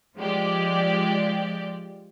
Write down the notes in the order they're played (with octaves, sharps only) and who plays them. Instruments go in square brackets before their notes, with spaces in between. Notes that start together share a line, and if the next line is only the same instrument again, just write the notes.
[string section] F3 G#3 G4 D5